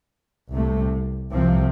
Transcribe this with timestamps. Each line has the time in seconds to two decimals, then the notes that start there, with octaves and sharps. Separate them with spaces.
0.54 C2 C3 A3
1.32 C2 C3 F3 C4